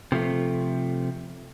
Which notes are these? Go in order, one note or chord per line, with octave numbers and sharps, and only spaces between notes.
C3 F3 A3